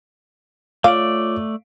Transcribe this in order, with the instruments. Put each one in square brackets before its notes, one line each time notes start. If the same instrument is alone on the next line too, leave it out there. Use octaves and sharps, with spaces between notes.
[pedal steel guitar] A3 D5 [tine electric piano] F4 C#5 D6 [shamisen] F5